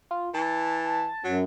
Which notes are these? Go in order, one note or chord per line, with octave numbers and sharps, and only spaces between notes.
F4
E3 A5
F#2 F#3